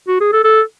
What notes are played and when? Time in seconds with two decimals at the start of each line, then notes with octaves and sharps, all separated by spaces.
0.08 F#4
0.21 G#4
0.33 A4
0.44 A4